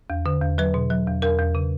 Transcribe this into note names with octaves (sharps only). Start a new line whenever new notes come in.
E2
D3
E2
F#3 B4
B2
F#3
E2
E2 A#4
E2
C#3